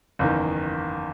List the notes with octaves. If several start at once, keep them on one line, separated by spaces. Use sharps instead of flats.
F#1 E2 D#3